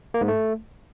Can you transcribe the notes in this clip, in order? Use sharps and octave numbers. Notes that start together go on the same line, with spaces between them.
A#3
G#2
A3